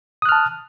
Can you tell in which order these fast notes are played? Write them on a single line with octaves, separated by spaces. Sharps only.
D#6 F#6 F6 A5